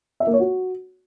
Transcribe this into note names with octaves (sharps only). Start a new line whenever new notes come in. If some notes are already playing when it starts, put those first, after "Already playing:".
E5
A#3
C#5
F#4